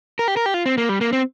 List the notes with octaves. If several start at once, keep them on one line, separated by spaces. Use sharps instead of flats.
A#4
G4
A#4
G4
F4
C4
A#3
G3
A#3
C4